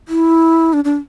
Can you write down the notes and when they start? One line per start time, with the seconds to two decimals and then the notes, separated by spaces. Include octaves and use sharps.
0.08 E4
0.73 D4
0.84 D4